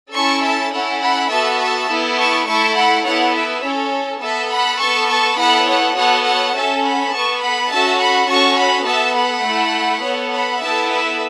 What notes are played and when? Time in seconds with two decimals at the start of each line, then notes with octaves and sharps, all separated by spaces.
0.15 C#4 E4 A4 A5 C#6
0.45 E5 A5
0.73 C#4 E4 A4 C#5 F#5
1.02 F#5 B5
1.31 B3 F#4 A4 E5 A5
1.60 E5 A5
1.89 B3 E4 A4
2.18 A5 C#6
2.48 A3 E4 A4 A5 C#6
2.77 F#5 B5
3.06 B3 E4 A4 C#5 F#5
3.35 B4 E5
3.64 C#4 A4 C#5
4.22 B3 A4 E5 A5
4.51 F#5 B5
4.80 B3 A4 A5 C#6
5.10 A5 C#6
5.39 B3 E4 A4 F#5 B5
5.68 C#5 F#5
5.97 B3 F#4 A4 C#5 F#5
6.26 C#5 F#5
6.55 C#4 A4 E5 A5
6.84 F#5 B5
7.13 B3 A4 A5 C#6
7.42 F#5 B5
7.71 C#4 F#4 A4 E5 A5
8.00 F#5 B5
8.30 C#4 F#4 A4 A5 C#6
8.58 F#5 B5
8.87 B3 A4 E5 A5
9.16 F#5 B5
9.46 A3 E4 A4
10.04 B3 A4 C#5 F#5
10.33 F#5 B5
10.63 B3 E4 A4 E5 A5
10.91 B4 E5